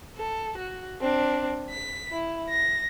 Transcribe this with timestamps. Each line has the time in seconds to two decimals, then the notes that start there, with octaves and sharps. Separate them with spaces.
0.16 A4
0.57 F#4
1.00 C4 D4
1.70 B6
2.11 E4
2.50 A#6